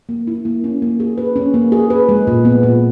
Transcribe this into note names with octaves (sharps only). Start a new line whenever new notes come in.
A#3
E4
A#3
C#4
A#3
G#4
B4
C#4
A#3
G#4
B4
G#3
A#2
B3
A#2